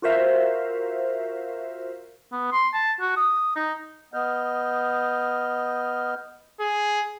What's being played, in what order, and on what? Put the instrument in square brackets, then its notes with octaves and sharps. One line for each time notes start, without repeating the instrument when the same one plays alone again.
[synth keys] F4 F#4 A#4 C5 E5 F5
[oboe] B3
C6
A5
F#4
D#6
D#4
[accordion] B3 D#5 F6 G6
[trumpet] G#4